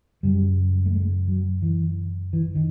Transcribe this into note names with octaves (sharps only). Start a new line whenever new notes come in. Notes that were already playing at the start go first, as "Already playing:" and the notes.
F#2 C#3 G3
A3
G#3
F#3
E3
E3
D#3